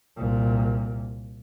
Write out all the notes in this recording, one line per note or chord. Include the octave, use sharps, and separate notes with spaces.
C2 A#2